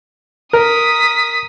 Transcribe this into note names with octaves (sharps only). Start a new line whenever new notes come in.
A#4 D#6 B6